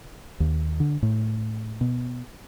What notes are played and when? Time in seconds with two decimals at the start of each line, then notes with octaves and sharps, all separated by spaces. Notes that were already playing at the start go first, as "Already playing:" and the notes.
0.40 D#2
0.80 D3
1.03 A2
1.81 B2